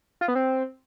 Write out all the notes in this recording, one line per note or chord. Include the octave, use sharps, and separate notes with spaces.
F4
B3
C4